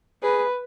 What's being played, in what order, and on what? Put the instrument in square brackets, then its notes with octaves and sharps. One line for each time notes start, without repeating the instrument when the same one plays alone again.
[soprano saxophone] G#4 [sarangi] B4